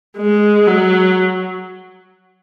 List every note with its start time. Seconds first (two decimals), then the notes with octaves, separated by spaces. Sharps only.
0.17 G#3
0.67 F#3